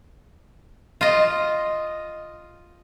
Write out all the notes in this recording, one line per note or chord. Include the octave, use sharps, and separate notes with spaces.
F4 D#5